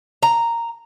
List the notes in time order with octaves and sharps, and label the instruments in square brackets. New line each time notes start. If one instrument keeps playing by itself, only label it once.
[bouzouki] A#5